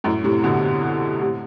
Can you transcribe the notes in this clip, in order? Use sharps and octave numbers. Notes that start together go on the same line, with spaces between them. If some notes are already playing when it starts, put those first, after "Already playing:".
F#2 A2
A2 C3
B2 D3
A2 C3